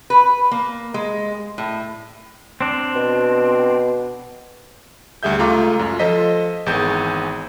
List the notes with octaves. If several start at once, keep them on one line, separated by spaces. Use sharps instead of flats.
B4
A#3
G#3
A2
C4 D4
B2
D2 G3 G#4 E5 G6
C#2 A3 F4 A#5 D6
F#2 F4
F3 A4 C5 D#5 B6
G#1 E2 G#4 G6